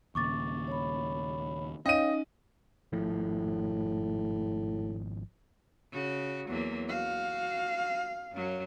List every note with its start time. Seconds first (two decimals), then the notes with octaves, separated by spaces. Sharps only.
0.15 D#2 A#2 C#3 C#6 D6 A6
0.67 C#5 B5
1.86 C#4 D#4 C#5 D#5 F5 G5 D#7
2.93 G#1 A2 F3
5.92 C#3 F#4
6.48 E2 F#3 A#3
6.89 F#4 F5
8.32 F#2 F#3